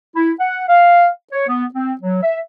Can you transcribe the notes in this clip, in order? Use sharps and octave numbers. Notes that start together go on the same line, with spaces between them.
E4
F#5
F5
C#5
B3
C4
F#3
E5